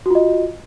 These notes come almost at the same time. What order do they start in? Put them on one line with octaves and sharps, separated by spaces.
F#4 F4 D#5